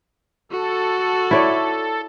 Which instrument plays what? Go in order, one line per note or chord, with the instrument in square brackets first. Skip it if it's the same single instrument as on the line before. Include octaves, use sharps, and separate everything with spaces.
[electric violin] F#4 [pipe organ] A4
[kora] E4 C#5 D5